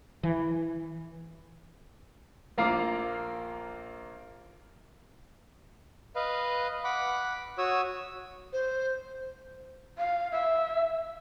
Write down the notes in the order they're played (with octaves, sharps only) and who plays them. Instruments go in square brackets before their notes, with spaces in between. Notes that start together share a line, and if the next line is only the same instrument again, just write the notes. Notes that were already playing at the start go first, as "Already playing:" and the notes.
[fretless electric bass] E3
[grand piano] A#1 A#3 F4 A#5 D6 C7
[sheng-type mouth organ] B4 D#5 F5
F#5 B5 D6
F#4 C#5 D#6 E6
[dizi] C5
[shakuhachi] F5
E5